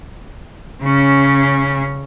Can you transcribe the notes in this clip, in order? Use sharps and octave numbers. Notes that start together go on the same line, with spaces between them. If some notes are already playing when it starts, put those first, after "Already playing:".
C#3 C#4